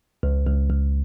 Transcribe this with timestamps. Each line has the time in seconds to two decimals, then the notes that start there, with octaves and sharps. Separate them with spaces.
0.23 C#2
0.46 C#2
0.70 C#2